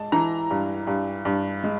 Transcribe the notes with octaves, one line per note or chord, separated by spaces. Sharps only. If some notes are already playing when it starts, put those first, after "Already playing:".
Already playing: G#3 A5
E3 A#5
G2
G2
G2
G#3